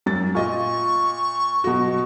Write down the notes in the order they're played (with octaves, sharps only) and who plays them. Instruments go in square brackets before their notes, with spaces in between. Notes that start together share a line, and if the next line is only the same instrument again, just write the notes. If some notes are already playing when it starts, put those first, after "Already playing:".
[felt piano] F#2 A6
[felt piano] A#2 D#5 [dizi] C#6
[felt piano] B2 F#3 F#4